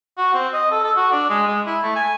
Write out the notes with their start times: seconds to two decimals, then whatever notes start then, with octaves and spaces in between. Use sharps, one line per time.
0.18 F#4
0.34 C4
0.53 D#5
0.71 A4
0.84 A4
0.96 F#4
1.11 D4
1.29 G#3
1.48 G#3
1.66 E4
1.83 A3
1.95 G#5